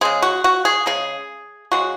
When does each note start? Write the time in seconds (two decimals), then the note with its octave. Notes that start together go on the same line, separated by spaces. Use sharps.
0.01 C#3 G#3 G#4
0.22 F#4
0.44 F#4
0.65 G#4
0.86 C#3 G#3 G#4
1.72 C#3 G#3 F#4